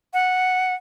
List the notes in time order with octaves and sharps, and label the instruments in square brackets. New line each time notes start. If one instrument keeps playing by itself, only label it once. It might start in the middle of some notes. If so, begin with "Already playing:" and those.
[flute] F#5